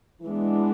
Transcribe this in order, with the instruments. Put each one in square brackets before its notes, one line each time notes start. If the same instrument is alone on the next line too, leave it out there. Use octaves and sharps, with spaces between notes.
[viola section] E3 G#3 B3 D4